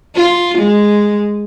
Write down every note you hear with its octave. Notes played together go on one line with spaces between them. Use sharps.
F4
G#3